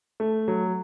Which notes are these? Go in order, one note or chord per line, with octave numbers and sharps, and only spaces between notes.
A3
F#3